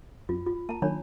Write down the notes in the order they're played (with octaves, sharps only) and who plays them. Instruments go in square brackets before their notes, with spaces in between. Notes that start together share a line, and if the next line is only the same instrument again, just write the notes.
[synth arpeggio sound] F#2 [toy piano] F4
[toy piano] F4
[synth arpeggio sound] A#3 [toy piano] A5 A#5
[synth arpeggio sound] D#3 F#3 A#3 [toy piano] D4 C#5 B5